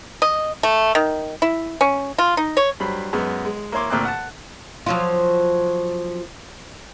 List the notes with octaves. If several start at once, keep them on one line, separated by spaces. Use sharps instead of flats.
D#5
A3
D#3
E4
C#4
F4
D#4
C#5
G2 F#3 C5 B5
F#2 G#3 B3
G#3
A#3 E4 C#5 C6 D6
D2 A#2 A#3 C4 D6 F#6
F#5 A5
F3 F#3 F4